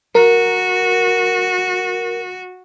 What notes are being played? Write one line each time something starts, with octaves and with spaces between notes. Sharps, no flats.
F#4 A#4